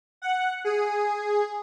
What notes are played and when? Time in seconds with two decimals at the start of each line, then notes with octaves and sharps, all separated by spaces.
0.22 F#5
0.65 G#4